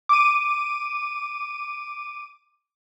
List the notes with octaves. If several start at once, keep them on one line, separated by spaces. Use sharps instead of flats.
D6 D#7